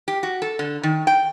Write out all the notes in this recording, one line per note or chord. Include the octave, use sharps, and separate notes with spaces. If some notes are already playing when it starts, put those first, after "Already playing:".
G4
F#4
A4
D3
D#3
G5